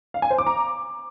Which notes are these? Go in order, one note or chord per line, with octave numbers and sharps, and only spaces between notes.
F5
G#5
C5
D6
A#5